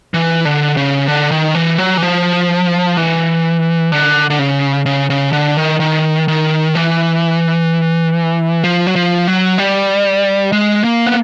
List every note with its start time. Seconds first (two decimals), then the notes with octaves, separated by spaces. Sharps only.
0.14 E3
0.45 D3
0.77 C#3
1.08 D3
1.31 D#3
1.55 E3
1.78 F#3
1.97 E3
2.03 F3
2.97 E3
3.92 D3
4.30 D3
4.39 C#3
4.86 C#3
5.10 C#3
5.33 D3
5.57 D#3
5.80 D#3
6.28 D#3
6.75 E3
8.64 F3
8.87 F#3
8.96 F3
9.28 F#3
9.58 G3
10.52 G#3
10.84 A#3
11.07 B3